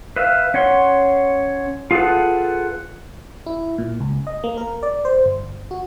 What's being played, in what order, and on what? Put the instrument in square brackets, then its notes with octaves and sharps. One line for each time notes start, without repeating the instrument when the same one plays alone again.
[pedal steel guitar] B4 E5 F5
C#4 C#5 F#5 C6
F4 G#4 A4 B4 F#5
[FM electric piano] E4
A#2
C#2
D#5
A#3
A#4
D5
C5
G1
F#4